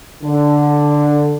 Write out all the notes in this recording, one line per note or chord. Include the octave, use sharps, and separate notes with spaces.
D3